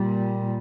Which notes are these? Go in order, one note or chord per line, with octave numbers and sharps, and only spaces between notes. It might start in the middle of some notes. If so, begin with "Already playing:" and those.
Already playing: A#2 G3